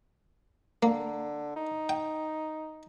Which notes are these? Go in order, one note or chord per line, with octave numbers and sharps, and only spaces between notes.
D3 A#3
D#4
G5